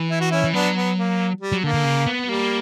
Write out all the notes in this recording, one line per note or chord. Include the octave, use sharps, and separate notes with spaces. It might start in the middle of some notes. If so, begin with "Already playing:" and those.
Already playing: E3
E4
F#4
C#4 E4
E3
F#3 B3 D4
B3
A#3
G3
F#3
D3 A#3
D3
C#3
B3
G3 A#3